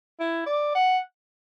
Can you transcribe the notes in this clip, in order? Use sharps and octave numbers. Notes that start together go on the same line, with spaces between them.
E4
D5
F#5